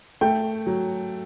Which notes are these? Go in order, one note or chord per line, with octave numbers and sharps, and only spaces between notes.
A3 G5
F#3